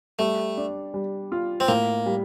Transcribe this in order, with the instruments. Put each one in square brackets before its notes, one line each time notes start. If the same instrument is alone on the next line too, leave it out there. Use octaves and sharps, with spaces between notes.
[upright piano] G3 [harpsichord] A3
[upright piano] D4
G3
F4
[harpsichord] C4
[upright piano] A2 [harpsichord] A#3
[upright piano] G3